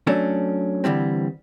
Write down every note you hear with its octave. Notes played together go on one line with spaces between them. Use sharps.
F#3 A3 C#4 D4
D3 E3 G3 C4